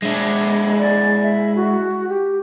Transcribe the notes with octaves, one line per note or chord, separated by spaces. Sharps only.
G#3 D4 E4
D5
E5
F#4
G4